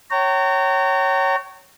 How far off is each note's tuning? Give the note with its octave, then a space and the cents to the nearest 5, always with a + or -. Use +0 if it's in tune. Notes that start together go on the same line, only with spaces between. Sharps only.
C#5 -5 G5 -40 A#5 -30